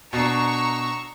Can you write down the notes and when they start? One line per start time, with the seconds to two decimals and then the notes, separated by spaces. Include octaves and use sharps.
0.13 B2 D4 A#5 C#6 E6